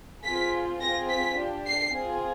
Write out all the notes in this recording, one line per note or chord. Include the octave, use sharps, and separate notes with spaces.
C4 F4 G#4 B6
C4 F4 G#4 A#6
B6
D4 G4
C7
C4 F4 G#4